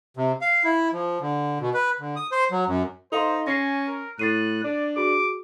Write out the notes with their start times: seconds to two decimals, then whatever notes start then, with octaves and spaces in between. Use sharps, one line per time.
0.17 C3
0.41 F5
0.64 E4
0.93 F3
1.21 D3
1.60 B2
1.74 B4
2.00 D3
2.16 D#6
2.32 C5
2.51 F#3
2.67 F#2
3.12 D#4 A4 C5 F5 C6
3.47 C#4 G#5 A#6 C7
3.87 A#4
4.19 A2 F#6 A6 C7 D#7
4.64 D4 D5
4.96 F#4 G#4 D6